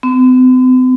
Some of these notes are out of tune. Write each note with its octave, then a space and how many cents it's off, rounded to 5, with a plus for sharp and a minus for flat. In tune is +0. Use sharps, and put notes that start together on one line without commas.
C4 -45